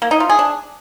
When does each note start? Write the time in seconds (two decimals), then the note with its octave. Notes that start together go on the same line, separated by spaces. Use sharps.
0.02 A#3
0.11 D#4
0.20 F4
0.30 G#4
0.39 D4